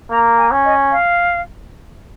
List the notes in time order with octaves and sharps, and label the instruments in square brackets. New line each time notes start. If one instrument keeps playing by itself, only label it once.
[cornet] A#3 [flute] A#5
[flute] G#5
[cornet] C#4
[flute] D#5
F5